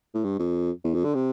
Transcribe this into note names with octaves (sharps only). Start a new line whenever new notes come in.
A2
G2
F2
E2
F2
D3
C3